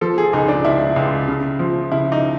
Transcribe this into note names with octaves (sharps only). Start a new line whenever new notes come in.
F3 A4
G#4
C#2 D#4
D4
C#2 E4
C#2
C#3
F3
C#3 E4
D#4